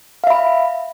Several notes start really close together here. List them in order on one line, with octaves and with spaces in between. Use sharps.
F5 E5 B5